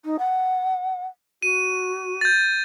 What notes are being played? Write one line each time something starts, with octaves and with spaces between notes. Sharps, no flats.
D#4
F#5
F#4 D#7
G6 A6